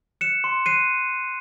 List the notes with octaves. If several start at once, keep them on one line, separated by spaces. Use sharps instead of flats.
F#6 C#7 E7
C6
F#6 C7 D#7